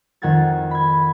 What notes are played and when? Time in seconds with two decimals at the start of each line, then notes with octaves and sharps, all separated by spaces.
0.22 F2 D#3 F#5 G#6 A6
0.71 B5 G#6